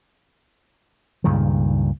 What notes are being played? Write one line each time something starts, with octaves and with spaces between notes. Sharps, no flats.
C#2 G2 A#2 D#3